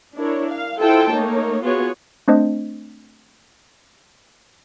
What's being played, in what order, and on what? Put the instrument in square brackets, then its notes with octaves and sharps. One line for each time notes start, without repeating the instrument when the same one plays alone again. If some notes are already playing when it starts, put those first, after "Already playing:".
[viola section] D4 E4 A#4 C#5
F5
E4 F4 A4 C5 G5 A5
A3 A#3 D#4 C#5
B3 F4 F#4 G#4 C#5
[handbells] A3 C4 D4 C5 D#5